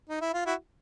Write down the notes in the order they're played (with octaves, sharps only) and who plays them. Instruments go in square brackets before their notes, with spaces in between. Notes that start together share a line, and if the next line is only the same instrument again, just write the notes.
[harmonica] D#4
E4
F4
E4 F#4